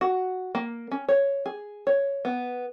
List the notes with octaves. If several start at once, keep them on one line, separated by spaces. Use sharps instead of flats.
F#4
A#3
C#4
C#5
G#4
C#5
B3